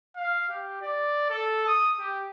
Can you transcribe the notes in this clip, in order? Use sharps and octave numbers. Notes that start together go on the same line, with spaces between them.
F5
G4
D5
A4
D#6
G4